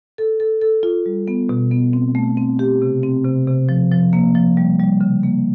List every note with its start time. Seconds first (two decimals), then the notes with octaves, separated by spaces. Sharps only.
0.18 A4
0.40 A4
0.61 A4
0.83 F4
1.06 G3
1.28 B3
1.49 B2
1.71 B3
1.93 C4
2.15 A3
2.37 C4
2.59 G4
2.82 C3
3.03 C4
3.25 C3
3.47 C3
3.69 F3
3.92 F3
4.13 A#3
4.35 F3
4.57 G3
4.79 G3
5.01 C#3
5.23 A#3